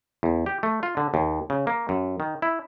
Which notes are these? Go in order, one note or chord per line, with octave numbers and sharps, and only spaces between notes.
E2
G4
A3
F4
D3
D#2
C#3
A#3
F#2
D#3
E4